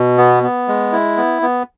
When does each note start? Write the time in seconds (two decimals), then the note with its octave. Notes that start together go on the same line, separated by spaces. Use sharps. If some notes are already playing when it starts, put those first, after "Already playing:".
Already playing: B2
0.18 B3
0.43 B3
0.68 G#3
0.92 E4
1.17 B3
1.42 B3